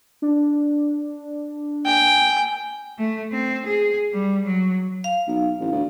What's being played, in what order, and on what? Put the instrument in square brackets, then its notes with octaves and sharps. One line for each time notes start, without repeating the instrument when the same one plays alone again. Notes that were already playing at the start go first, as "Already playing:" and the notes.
[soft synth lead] D4
[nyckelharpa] G5 [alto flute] G#5
[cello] A3
C4
G#4
G3
F#3
[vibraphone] F5
[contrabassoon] B1
A1
D2